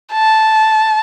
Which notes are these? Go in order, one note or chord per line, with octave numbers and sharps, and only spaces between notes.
A5